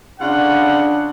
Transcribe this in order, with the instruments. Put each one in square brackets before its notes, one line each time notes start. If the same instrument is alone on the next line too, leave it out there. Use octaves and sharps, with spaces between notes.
[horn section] C#3 D4 F4 F#5